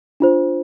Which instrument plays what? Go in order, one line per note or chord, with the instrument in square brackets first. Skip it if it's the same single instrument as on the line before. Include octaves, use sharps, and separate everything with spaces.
[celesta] D4 F4 C5